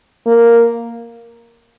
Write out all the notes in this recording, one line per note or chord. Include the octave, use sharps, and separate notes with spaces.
A#3